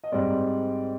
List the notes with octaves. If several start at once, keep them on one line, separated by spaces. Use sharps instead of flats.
D#5
G#2 G3 C4 D5